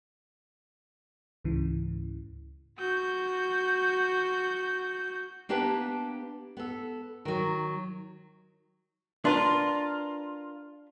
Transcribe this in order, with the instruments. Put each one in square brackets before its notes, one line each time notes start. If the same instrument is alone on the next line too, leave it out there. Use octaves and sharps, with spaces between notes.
[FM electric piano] C#2 G#2 C#3 E3
[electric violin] F#4 G6
[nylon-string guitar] A#3 B3 D4 G4 B4 A5
B3 A4
D#3 F#3
[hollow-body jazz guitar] D4 B4 [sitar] F4 A#4 [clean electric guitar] C6